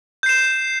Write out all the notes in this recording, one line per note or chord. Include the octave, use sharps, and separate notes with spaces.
G6 C7 E7